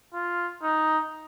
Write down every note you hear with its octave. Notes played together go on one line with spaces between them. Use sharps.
F4
D#4